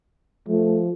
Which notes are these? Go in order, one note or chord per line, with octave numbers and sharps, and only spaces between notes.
F3 A3